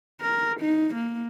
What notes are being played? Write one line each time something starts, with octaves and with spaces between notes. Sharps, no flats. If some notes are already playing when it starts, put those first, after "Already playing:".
A#4
D#4
A#3